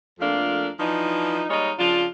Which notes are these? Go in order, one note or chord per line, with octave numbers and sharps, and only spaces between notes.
F2 F3 A3 A#3 D4 F5
E3 F3 D4 D#4
G3 G#3 A#3 D#4 C#5 D#5
C#3 F3 D4 F4